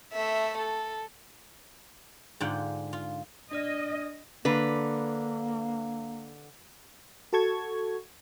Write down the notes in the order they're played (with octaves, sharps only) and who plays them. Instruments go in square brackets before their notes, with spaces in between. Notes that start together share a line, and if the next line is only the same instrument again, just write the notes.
[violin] A3 E5
A4
[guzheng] G#2 D3 F4 F#5 G5
F4
[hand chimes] D4 D5 F6 [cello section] D#5
[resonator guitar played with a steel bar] D3 B4 [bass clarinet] A#3
[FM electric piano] F#4 A4 A5 C#6 G#6